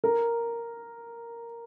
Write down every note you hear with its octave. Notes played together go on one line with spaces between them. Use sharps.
A#4